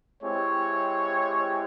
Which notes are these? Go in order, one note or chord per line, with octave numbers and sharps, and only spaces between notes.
G#3 C4 E4 G4 C#5